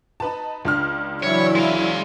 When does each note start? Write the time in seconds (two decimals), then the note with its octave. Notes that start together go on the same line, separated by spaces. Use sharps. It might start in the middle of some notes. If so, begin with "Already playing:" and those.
0.20 D#4 B4 A5
0.65 C#2 D4 F6
1.23 E3 F#3 E4 C#5 D5
1.55 G#3 F5